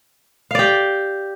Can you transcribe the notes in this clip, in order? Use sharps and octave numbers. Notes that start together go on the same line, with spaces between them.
G4 D5 F5